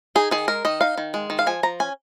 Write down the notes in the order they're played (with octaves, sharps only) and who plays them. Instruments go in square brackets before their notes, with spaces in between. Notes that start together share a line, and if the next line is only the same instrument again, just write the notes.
[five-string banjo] D#4 G#4
D#3 G#4
G#3 A#4
D#3 D#5
D#4 F5
D#3
G#3
D#3
F5
F3 G#5
F3 A#5
C#4 G#5